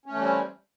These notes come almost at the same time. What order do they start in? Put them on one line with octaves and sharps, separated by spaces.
C#4 A3 E3 G3 C4